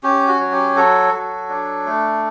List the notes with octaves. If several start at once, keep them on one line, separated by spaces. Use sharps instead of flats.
C#4 G4
F#4
F#3
G4
F#4 A4
F#3
D4
A3